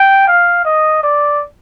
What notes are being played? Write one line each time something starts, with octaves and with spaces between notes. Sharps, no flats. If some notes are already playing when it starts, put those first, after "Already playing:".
Already playing: G5
F5
D#5
D5